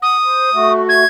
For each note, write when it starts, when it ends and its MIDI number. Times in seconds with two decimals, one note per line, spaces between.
0.02 0.17 78
0.02 0.73 87
0.24 0.50 72
0.54 1.04 57
0.54 1.04 66
0.89 1.07 92